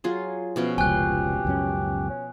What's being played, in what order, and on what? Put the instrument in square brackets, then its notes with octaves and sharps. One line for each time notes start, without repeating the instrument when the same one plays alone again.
[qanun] F#3 F4 G#4
[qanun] B2 F3 C#4 [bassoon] E3
[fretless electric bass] F1 C#2 [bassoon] G4 [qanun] G5 [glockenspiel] G#5 F#6
[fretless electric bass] C#2 F#2 C#4
[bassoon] C#4